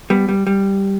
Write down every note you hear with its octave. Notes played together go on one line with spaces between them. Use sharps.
G3 B3
G3
G3